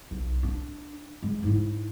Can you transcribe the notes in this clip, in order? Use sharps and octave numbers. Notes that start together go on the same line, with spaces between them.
B1
D4
G#3
G#2 E4